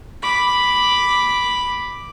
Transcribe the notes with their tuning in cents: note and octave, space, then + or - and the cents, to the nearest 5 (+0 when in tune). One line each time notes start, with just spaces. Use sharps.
B5 +0 D6 +0